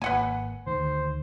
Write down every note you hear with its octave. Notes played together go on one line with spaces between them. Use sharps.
G#1 A#3 B4 F#5 G#5
D2 D#3 C5